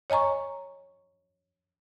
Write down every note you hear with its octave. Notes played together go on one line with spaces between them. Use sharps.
C#5 D#5 G#5 A#5 C#6